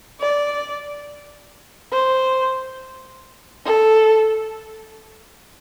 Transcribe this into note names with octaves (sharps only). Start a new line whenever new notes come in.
D5
C5
A4